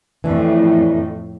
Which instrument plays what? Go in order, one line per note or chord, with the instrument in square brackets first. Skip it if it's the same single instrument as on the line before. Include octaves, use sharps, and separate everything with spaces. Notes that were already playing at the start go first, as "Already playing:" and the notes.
[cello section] F2 A2 [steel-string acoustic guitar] E3 D4